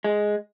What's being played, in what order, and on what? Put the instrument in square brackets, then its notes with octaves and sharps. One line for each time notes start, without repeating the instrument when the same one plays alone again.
[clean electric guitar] G#3